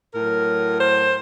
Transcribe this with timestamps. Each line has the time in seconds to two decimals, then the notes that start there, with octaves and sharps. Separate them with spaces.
0.14 A2 F#3 A#4
0.80 C5